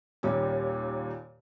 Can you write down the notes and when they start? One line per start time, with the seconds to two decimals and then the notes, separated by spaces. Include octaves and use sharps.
0.23 D#2 A#2 G3 C#4